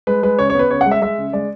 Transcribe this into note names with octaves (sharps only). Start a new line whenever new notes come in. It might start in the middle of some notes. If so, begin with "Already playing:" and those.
G#3 B4
G#3 B4
C#3 C#5
C#5
B3 B4
C#3 C#5
F#5
G#3
E5
G#3 E5
C#3
G#3 D5